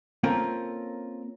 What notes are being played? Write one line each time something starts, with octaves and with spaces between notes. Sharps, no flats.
A#3 C4 C#4 F4 A4 A#4